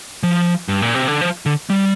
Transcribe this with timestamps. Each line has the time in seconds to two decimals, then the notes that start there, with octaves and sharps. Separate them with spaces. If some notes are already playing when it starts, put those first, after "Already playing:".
0.23 F3
0.68 G2
0.82 A#2
0.95 C3
1.08 D3
1.21 F3
1.46 D3
1.70 G3